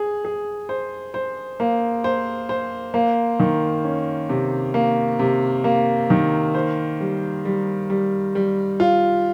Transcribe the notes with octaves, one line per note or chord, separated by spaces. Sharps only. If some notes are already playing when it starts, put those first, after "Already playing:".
Already playing: G#4
G#4
C5
C5
A#3
C5
C5
A#3
D#3
C#4
C3
A#3
C3
A#3
D#3
C5
G3
G3
G3
G3
F4